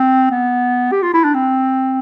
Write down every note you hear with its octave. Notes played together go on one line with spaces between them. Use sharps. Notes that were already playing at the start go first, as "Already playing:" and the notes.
Already playing: C4
B3
G4
F4
E4
D4
C4